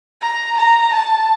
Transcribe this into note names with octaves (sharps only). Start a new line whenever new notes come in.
A#5
A#5
A5